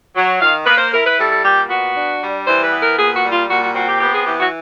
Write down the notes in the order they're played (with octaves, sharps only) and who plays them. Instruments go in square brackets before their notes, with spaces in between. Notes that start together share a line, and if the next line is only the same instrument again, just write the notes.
[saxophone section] F#3
D#3 F5
A#3 B4
C5
E4 A#4
B4
G3 A4
A4
A#2 G4
B3 F#4
D4
G3
E3 C5
B4
B3
A#4
A#2 G#4
F#4
G3
F4
A#2 F#4
F#4
C4 F#4
G4
B3 G4
G#4
E3 G4
F#4